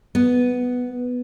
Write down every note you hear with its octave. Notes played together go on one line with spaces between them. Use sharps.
B3